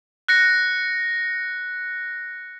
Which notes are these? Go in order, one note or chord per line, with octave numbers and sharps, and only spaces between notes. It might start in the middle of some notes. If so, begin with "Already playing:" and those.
F#6 A#6 C#7